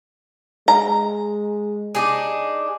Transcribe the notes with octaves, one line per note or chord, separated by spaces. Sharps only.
G#3 A#5
D4 D#4 G#4